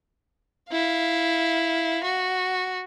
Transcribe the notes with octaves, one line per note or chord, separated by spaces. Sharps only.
E4 F5
F#4